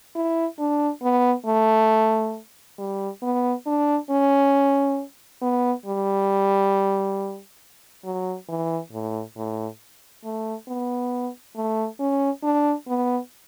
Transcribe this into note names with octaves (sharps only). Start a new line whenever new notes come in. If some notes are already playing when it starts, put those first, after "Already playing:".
E4
D4
B3
A3
G3
B3
D4
C#4
B3
G3
F#3
E3
A2
A2
A3
B3
A3
C#4
D4
B3